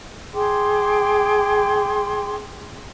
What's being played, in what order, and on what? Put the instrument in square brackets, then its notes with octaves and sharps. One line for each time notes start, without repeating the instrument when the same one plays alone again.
[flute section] G#4 G5 C6 D6